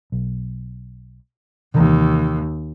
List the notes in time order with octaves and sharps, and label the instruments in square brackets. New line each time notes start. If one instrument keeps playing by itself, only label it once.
[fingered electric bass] B1
[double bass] D#2 [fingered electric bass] C3 E3 G#3